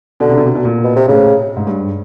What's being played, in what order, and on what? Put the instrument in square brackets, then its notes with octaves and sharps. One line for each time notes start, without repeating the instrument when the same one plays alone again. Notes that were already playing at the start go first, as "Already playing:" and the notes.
[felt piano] B2 [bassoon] D3
[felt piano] C3
B2
C3
B2
A#2
[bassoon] B2
C3
[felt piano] A2 [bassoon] C#3
[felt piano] G#2
G2